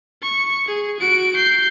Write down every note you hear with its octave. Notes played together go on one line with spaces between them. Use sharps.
C#6
G#4
F#4 D7
G6 C7